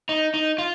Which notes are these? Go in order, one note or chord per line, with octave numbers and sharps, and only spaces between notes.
D#4
D#4
F4